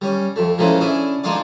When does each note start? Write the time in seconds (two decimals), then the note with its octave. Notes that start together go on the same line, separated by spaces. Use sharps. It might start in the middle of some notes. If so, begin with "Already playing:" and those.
0.02 G3 C#4
0.36 F2 A3
0.58 A#2 E3 F3 G#3 A3 C#4
0.80 C#4 D4 E4 G#4
1.24 F3 G#3 D4 D#4 F4 D5